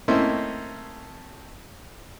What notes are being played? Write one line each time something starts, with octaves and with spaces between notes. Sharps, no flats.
A3 A#3 C4 C#4 D#4 E4